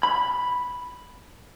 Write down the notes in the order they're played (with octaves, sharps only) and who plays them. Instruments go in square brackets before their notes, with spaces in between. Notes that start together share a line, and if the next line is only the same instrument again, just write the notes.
[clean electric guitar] B5